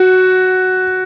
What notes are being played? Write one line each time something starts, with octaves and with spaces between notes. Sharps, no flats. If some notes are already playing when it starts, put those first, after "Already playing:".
Already playing: F#4